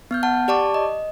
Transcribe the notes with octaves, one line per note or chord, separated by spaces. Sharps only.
B3 F6 G6
F#5 A5
G4 D5 A5 C#6 D6
D#5